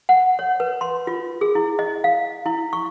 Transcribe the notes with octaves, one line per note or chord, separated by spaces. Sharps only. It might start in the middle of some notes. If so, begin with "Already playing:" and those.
F#5
C#5
B4
C6
F4
G#4
E4
D#5
F5
E4
C#6